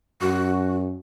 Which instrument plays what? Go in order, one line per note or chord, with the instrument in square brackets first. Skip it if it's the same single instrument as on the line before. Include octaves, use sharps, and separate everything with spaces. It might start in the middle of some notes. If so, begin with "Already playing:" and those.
[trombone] F#2 [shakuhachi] F#4